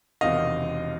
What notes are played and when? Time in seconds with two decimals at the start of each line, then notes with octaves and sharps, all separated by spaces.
0.21 E1 E2 C3 D#3 D#5 F5